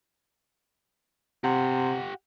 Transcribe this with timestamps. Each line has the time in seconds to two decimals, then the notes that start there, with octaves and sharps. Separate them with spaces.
1.44 C3 G4 F#5